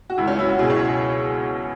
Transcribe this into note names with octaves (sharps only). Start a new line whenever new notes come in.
F#4
C#2 E4
C#4
F#3 E4
F#4
B2 G#4
C#5